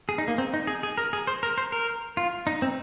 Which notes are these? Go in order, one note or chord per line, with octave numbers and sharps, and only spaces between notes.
G#4
D#4
A#3
C4
D#4
G#4
G#4
A#4
G#4
C5
A#4
C5
A#4
F4
D#4
C4